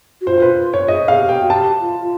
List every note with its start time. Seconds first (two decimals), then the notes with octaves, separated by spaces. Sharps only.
0.21 F#4
0.27 F4 C5
0.38 C5
0.42 B4
0.73 C#5
0.88 G#4 D#5
1.08 F5
1.15 G#4
1.19 G4
1.29 G5
1.41 F#4
1.50 G4 A5
1.80 F4
2.00 F4